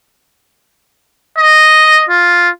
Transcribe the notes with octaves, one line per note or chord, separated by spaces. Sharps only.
D#5
F4